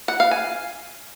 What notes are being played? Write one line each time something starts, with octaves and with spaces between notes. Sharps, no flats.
F#5
F5
G#5